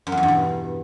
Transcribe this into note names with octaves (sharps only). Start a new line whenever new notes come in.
F#2
F2
E2
G2
B2